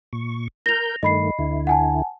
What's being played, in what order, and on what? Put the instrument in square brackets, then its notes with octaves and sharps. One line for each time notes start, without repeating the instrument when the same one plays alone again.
[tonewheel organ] A#2 C#6
[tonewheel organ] A#4 G6 [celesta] A#6 F7
[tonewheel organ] G2 D#3 A3 [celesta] D#5 B5 C7
[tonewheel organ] D2 D3 E4
[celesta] F#5 G#5 A5